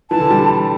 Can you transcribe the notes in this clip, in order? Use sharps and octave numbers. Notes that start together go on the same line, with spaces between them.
E3 A5
D3
G3